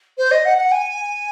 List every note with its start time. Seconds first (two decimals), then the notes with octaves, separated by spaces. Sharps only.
0.18 C5
0.31 D#5
0.45 F#5
0.58 F#5
0.71 G#5